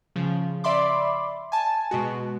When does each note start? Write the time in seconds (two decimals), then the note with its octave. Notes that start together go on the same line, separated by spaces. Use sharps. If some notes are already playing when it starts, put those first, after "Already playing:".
0.16 C#3 F3
0.64 D5 E5 B5 C6 D6
1.52 G#5 A5
1.91 B2 G#3 F#4